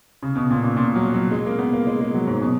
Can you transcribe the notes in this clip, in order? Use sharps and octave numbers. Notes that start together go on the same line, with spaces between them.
C#3
B2
A#2
A#2
A#2
F#3
F#3
G#3
A#3
B3
A#3
G#3
G#3
F#3
G#2
B2